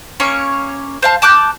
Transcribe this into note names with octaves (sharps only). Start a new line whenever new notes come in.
A#3 C#4 C#5 C#6
C5 F5 A5
A5 D6 F#6 G6